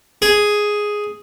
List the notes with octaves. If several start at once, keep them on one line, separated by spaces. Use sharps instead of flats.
G#4